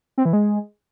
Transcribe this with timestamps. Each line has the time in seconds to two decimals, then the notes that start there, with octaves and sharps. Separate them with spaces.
0.18 C4
0.25 E3
0.33 G#3